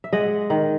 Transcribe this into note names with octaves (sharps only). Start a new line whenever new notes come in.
E5
G#3 D#5 F#5
D#3